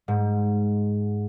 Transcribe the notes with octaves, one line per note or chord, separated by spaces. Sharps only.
G#2